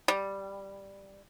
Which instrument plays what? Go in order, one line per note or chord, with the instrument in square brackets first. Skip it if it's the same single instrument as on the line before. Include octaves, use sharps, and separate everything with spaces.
[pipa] G3